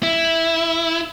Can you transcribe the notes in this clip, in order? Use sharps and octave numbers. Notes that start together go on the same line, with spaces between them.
E4